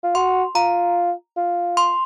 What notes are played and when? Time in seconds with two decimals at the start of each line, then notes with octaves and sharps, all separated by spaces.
0.03 F4
0.15 F#4 C6
0.55 F4 A#5
1.36 F4
1.77 C6